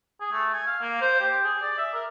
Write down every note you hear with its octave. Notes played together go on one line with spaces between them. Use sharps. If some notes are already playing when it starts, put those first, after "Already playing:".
G#4
A3
G#5
F5
A#3
C5
G4
G#4
D5
E5
A#4